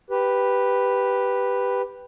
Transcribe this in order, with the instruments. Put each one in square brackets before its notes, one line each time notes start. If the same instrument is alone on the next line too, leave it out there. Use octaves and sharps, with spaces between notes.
[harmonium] G4 B4